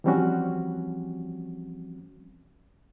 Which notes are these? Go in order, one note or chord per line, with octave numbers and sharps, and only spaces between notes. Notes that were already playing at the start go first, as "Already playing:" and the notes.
E3 F3 G3 C4 C#4 F#4